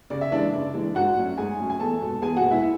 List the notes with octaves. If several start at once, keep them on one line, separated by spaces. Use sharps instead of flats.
C#3 D5
E5
E3 G#3 D4 D5
C#3
E3 G#3 D4
G#2 F#4 F#5
F#3 A3 C#4
G#2 G#4 G#5
F#3 A3 C#4
G#5
E2 A4 A5
B2 G#3
E2 G#4 G#5
F#4 F#5
B2 G#3
E4 E5